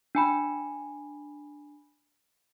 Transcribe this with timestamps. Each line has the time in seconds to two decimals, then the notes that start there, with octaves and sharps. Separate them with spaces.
0.15 D4 G#5 B5